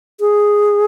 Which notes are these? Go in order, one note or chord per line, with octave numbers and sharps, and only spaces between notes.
G#4